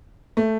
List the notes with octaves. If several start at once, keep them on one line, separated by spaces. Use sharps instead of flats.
A3